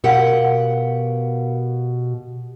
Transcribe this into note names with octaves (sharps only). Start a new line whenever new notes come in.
B2 G4 A#4 F5 F#5